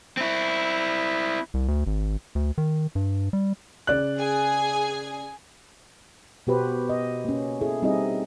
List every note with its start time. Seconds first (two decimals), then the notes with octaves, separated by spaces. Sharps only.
0.17 C4 E4
1.54 C2
1.68 D2
1.87 G#1
2.35 D2
2.58 D#3
2.95 G2
3.33 G3
3.87 C#3 D5 F#6
4.19 G#4 G#5
6.47 B2 B3 F#4 G4 B4 C5
6.89 D#5
7.25 A#3 C#4
7.61 E4 G#4 A4
7.82 G3 C4 D#4 E4 G#4 D#5